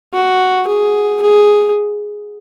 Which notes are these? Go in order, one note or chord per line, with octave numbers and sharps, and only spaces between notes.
F#4
G#4
G#4